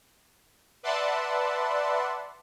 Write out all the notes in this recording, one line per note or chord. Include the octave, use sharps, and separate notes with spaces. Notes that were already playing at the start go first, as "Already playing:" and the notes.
B4 D5 E5 F#5 A5 C6